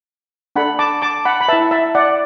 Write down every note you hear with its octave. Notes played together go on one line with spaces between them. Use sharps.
D4 A4 F#5 B5
A5 D6
A5 D6
F#5 B5
B5
E4 B4 E5 A5
E5 A5
D5 F#5